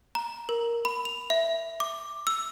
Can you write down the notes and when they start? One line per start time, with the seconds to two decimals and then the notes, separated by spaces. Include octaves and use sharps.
0.15 A#5
0.49 A#4
0.85 B5
1.05 F7
1.30 E5
1.80 D6
2.27 E6